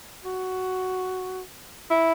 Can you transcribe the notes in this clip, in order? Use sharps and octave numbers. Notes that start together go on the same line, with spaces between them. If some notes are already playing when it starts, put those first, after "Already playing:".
F#4
E4